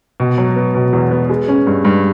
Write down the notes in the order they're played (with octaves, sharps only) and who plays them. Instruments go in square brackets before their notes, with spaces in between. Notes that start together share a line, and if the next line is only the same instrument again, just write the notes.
[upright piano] B2
F#3
B3
B2
E2
B3
G#3
C#4
G2
G2